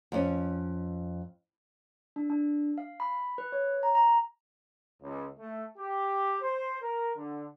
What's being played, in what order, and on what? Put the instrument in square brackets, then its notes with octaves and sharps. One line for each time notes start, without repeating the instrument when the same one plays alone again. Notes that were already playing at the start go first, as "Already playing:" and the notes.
[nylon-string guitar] F2 C#4
[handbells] D4
D4
F5
B5
B4
C#5
A#5
A#5
[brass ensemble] C#2
A3
G4
C5
A#4
D3